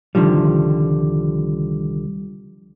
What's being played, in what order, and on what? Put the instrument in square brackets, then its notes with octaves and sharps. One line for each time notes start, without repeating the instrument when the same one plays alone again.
[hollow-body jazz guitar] C2 D3 D#3 F3 G3